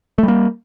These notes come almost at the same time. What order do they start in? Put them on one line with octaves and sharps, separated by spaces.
A3 G3 A#3